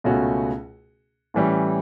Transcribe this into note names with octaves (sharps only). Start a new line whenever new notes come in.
C#2 B2 A3 C#4 F#4
A2 E3 G3 C#4